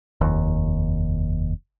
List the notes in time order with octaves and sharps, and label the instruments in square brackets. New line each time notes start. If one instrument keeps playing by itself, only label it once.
[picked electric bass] F1 D#2